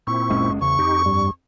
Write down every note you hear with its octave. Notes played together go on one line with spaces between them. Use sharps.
A#2 C4 E4 C#6
F#1 G#3 C#4
E2 C#3 C#6
F2 D#4 G4
G2 G3